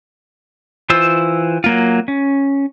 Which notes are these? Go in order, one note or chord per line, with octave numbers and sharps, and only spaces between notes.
E3 F4 C5 E6
F#3 A#3 F4
C#4